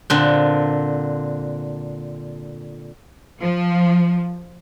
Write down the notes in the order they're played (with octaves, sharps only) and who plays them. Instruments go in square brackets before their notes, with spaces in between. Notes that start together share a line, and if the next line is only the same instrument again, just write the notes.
[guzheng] A#2 D3 C4
[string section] F3